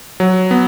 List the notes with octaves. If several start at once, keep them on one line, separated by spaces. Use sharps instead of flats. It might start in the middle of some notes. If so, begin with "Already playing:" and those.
F#3
B3